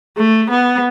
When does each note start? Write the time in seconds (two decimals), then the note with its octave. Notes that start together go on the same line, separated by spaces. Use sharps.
0.17 A3
0.50 B3